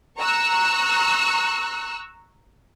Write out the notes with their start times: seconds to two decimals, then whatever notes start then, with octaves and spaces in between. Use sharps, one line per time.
0.18 A#5 C#6 E6 F#6